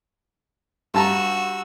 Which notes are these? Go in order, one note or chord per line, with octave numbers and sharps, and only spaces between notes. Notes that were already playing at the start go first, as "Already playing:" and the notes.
G2 F#4 A5 A#5 E6